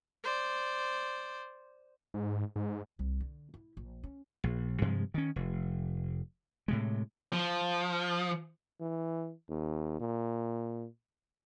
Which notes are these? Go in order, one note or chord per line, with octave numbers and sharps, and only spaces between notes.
C5 D5
G#2
G#2
C2
D3
E4
A#1
C#4
A#1
G2 C3 F3 G#3
D#3 C#4
F1
A2 C3 G#3
F3
E3
D#2
A#2